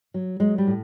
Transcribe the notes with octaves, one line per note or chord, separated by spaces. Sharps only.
F#3
F#3 G#3
G3
A2